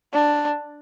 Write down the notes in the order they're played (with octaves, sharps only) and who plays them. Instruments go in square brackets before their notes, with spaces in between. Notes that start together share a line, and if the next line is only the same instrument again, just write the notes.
[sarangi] D4